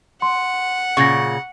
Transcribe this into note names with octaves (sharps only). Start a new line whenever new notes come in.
F#5 C6
A#2 C#3 C#6 A#6